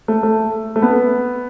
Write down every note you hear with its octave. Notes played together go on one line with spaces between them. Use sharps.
A3
A3
A3
B3